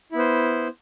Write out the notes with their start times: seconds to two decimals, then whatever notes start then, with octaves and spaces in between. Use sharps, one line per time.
0.12 E4
0.15 B3
0.19 C5